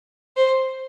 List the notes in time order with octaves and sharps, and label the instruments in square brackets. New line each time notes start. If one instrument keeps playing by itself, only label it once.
[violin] C5